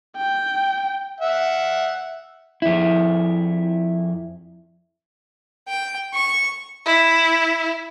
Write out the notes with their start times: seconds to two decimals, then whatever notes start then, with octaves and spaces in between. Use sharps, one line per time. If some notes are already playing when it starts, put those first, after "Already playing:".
0.16 G5
1.20 E5 F#5
2.62 F2 E4
5.68 G5
6.14 C#6
6.85 E4